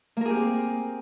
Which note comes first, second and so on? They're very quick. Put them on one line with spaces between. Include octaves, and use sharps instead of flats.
A#3 A#4 G#4 G4 C4